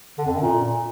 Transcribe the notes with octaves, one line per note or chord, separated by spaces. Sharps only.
D3
F2
F#2
A#2